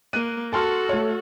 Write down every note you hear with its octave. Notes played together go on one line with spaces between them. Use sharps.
A#3 F#6 D#7
F#4 A4 A5 C6 F6
A3 C#5